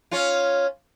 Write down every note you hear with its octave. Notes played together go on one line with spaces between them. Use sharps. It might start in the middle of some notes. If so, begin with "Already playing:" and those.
C#4 F4